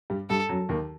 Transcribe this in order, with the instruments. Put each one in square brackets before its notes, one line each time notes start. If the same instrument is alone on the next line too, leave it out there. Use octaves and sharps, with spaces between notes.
[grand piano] G2 G3
[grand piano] G2 G3 [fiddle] A4
[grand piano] F#2 F#3
D#2 D#3